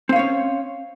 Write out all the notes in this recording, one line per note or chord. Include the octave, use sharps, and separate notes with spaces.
C4 C#4 C#5 F5